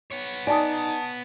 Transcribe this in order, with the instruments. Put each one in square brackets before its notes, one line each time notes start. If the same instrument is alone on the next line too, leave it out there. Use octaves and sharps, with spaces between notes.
[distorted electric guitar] B3 C#5
[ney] D#4 [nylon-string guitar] D5 [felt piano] G#5 A5 D#6